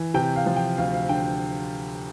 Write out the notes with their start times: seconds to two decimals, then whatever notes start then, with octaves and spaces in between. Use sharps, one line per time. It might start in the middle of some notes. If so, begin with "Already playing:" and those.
Already playing: E3
0.14 C3 G5
0.36 F5
0.46 F3
0.56 G5
0.78 D2 F5
0.94 F5
1.09 D3 G5